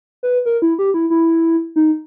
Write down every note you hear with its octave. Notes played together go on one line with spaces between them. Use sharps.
B4
A#4
E4
G4
E4
E4
D#4